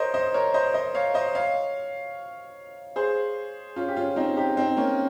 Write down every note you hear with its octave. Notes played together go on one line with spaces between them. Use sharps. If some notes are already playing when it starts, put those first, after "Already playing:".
Already playing: A#4 C5 C#5 D#5
C5 D#5
A#4 C#5
C5 D#5
C5 D#5
C#5 F5
C5 D#5
C#5 F5
G#4 C5
C#4 F4
G4
C#4 F4
C4 D#4
D#4 G4
C4 D#4
A#3 C#4